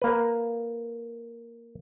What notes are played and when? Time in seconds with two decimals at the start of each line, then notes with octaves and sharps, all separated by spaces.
0.02 A#3 B4